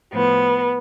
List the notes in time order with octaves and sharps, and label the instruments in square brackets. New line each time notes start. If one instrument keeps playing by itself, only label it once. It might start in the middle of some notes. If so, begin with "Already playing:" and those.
[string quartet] A2 F3 B3